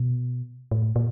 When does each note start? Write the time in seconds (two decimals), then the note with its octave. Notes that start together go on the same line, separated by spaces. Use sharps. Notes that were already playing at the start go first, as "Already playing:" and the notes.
Already playing: B2
0.71 A2
0.96 A#2